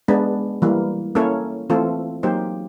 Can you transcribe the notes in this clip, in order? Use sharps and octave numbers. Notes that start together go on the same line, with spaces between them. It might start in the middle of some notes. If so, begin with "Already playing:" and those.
G#3 B3 D4
E3 G3 A#3
A#3 C#4 E4 A4 C#5
E3 A3 C4 F4 A4
F#3 A#3 D#4 G4 C5